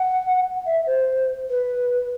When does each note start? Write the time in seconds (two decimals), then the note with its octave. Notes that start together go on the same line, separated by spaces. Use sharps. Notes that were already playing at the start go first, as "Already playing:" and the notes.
Already playing: F#5
0.66 E5
0.87 C5
1.50 B4